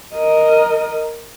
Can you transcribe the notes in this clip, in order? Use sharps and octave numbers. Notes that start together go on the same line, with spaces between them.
A#4 D#5